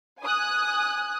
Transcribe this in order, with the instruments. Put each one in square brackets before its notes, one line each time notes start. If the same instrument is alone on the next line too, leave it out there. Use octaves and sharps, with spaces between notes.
[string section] G#5 D#6 F#6